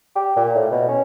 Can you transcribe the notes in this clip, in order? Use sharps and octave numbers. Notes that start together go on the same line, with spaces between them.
G4
A#2
A2
B2
C#4